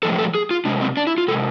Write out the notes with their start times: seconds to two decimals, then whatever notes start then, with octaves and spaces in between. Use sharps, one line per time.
0.03 A2 F3 G#3 A4
0.18 A4
0.35 G#4
0.51 F4
0.65 C3 G#3 D4
0.81 C4
0.97 D4
1.07 E4
1.18 F4
1.28 C3 A4
1.31 G#3